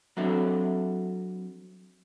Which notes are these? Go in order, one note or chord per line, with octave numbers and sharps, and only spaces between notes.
F#3 C4 D4 F#4 A4 E5